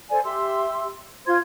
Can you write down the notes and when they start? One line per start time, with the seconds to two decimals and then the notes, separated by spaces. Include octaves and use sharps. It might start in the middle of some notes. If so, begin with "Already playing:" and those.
0.10 A4 C5 D5 G#5
0.24 G4 E5 C6 E6
1.26 F4 C5 C6 G#6